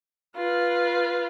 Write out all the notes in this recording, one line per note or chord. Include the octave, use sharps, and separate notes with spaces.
F4 B4